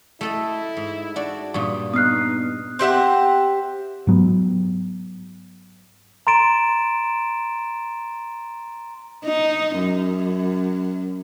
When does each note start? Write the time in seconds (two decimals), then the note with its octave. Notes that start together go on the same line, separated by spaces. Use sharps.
0.21 A3 E4 A4 D#5
0.77 G#2
1.16 D4 F#4 D5
1.54 G2 A#2 C#6 D#6
1.94 B3 D#4 D#6 F6 F#6 C7
2.79 C4 G4 E5 F#5
4.07 G#2 F#3 B3
6.27 A#5 C6 A6 D7 E7
9.25 D#4
9.78 F#2